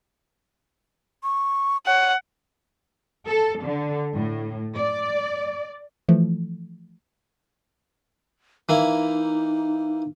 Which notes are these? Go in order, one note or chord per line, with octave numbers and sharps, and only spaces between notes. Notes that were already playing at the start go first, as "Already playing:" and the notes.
C#6
C#5 F#5
A4
D3
A2
D5
E3 F3 A3
E3 A#3 D#4 E4